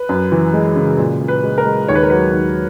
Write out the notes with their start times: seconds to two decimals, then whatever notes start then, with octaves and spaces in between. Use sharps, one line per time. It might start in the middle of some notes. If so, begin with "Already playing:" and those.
Already playing: B4
0.09 F#2
0.32 E3
0.53 G#3
0.76 C#3
0.98 A#2
1.20 A#2
1.28 B4
1.43 G#3
1.58 A#4
1.65 G#3
1.88 D#2 C#5
1.95 B4
2.03 A#4
2.10 F#3 B4
2.32 D#2